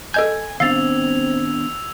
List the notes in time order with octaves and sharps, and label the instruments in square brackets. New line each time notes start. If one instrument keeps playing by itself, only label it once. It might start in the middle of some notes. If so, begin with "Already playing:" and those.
[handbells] A4 D#5 G6 [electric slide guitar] G#5 [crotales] G#6
[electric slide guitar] D#3 B3 D4 [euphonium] C4 [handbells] F5 A6 [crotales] E6 F7